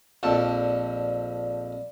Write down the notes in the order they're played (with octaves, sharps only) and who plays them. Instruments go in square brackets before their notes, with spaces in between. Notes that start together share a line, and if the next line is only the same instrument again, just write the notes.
[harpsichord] A#1 F2 A4 [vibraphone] D5